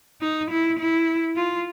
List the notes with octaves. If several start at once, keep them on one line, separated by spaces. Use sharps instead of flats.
D#4
E4
E4
F4